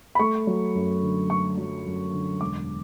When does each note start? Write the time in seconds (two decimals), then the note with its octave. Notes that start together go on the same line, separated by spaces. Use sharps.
0.15 B5
0.19 A3 C#6
0.47 F#3
0.75 F#2
1.02 D3
1.30 A3 C#6
1.57 F#3
1.86 F#2
2.13 D3
2.41 E1 D6